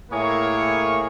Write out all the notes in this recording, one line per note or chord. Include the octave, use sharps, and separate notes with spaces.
A2 A#3 E4 G#4 A#4 C#5